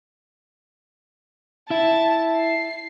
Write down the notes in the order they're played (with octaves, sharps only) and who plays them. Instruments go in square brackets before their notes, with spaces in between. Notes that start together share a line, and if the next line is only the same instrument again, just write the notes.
[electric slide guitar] E4 E5 [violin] A5
[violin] C7